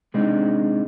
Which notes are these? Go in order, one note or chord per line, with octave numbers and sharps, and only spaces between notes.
C3 G#3 C4 D4 D#4